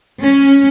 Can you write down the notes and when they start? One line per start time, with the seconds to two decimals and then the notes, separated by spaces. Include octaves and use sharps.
0.21 C#4